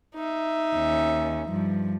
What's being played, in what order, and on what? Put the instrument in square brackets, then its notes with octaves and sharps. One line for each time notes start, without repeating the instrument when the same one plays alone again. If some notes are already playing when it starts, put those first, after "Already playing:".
[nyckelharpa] D#4 E5
[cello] D#2 C#4
G2 F3